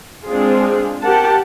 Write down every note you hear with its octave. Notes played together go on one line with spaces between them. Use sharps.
G#3 C4 D4 F4 G#4
G4 A#4 F#5 A5